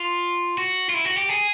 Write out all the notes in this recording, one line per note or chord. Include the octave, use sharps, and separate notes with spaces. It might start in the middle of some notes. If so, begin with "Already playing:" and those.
Already playing: F4
F#4
F4
E4
F#4
G4
G#4